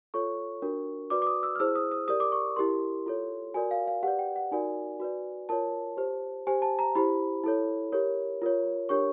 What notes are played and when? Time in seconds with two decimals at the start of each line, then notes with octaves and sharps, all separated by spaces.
0.14 F4 A4 C#5 C#6
0.62 D4 F#4 A#4
1.10 F#4 B4 D5 D6
1.22 D6
1.27 D#6
1.43 E6
1.56 F6
1.60 E4 G#4 C5 E6
1.75 D#6
1.92 D#6
2.08 G4 A#4 D5 D#6
2.20 D6
2.32 C#6
2.56 E4 G4 A#4 C6
3.06 F4 A4 C#5
3.54 F#4 A#4 D5 G#5
3.71 F5
3.87 F5
4.03 G4 B4 D5 F#5
4.19 G5
4.36 F#5
4.52 D#4 F#4 A#4 D5 G#5
5.00 F#4 B4 D5
5.49 F4 A#4 C#5 A5
5.97 G4 C5
6.47 G4 C5 G#5
6.62 A5
6.79 A#5
6.95 E4 G4 C5 B5
7.44 E4 A4 C#5
7.92 G4 A#4 C#5
8.42 F4 A#4 C#5
8.89 D4 G4 A#4 C#5 C#6